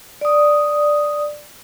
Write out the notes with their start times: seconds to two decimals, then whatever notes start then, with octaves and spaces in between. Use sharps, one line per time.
0.21 D5 D#6